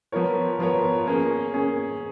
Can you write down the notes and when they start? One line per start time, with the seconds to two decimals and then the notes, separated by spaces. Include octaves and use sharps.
0.12 F3 B3 F4 A#4 C#5
0.59 F3 B3 F4 A#4 C#5
1.06 A#3 C#4 G#4
1.53 A#3 C#4 G#4